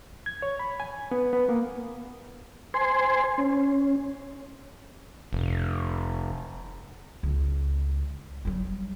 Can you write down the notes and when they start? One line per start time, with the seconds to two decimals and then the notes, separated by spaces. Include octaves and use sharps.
0.26 G#6
0.42 C#5
0.59 B5
0.80 G#5
1.11 B3
1.33 B3
1.49 A#3
2.74 C5 G#5 C6
3.38 C#4
5.33 F1
7.23 C#2
8.45 F#3 G3